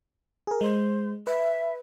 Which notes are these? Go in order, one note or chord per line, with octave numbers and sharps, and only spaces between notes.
G#4 A#4
G#3 C5
B4 E5